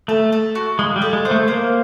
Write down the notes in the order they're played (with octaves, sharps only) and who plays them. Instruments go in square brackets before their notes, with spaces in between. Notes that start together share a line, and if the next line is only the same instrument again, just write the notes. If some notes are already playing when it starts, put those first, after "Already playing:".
[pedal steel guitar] A3 [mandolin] A4
[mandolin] A4
F#4
[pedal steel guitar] G#3 [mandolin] F4
[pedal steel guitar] G3
[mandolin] A4
[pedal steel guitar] G#3
[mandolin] C5
[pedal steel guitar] A3
[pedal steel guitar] A#3 [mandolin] C5